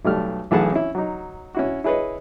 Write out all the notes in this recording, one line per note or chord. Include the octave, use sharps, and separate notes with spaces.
B1 G3 A3 F6
B1 E3 A3 G#4 F#5 A5
C#4 E4
F#3 D#4
C#4 E4 F#4
E4 G#4 B4 C#5 D#5